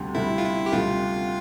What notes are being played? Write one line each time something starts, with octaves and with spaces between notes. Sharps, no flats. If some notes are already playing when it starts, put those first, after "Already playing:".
Already playing: D2 C3 G3
D2 C3 G3 E4
F4
E4
G4
D2 C3 G3 F4